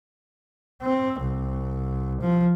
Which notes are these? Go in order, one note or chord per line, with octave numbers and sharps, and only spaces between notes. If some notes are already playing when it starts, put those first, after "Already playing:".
C4
C2
F3